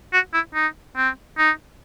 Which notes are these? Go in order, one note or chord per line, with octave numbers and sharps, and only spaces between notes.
F#4
E4
D#4
C4
D#4